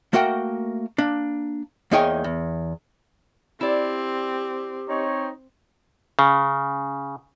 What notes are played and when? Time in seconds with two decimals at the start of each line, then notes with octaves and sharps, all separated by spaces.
0.13 A3 A#3 F#4 A#4 F#5 G5
0.98 A#3 D4
1.91 E2 A#3 D#4 G#4 C#5 G5
2.24 E2
3.61 C4 E4 G4 D5
4.89 C4 D#4 C#5
6.19 C#3